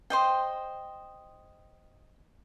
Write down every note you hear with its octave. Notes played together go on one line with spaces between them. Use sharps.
C5 D#5 G5